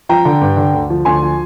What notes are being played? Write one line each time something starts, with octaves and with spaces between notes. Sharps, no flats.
F3 G5 A#5
D3
G2
D3
D2
F3
D2 G#5 C6
F3